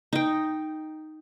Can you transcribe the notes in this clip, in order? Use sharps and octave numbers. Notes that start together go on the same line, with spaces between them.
D#4 G5